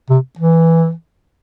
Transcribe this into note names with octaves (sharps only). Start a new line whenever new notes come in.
C3
E3